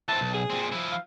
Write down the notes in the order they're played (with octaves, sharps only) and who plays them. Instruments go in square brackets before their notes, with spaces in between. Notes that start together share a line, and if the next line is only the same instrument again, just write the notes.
[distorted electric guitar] E3 C4 [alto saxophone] A5
[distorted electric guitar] B1
[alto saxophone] G#4
[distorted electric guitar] A#2 C4
F3 E4
[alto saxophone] F5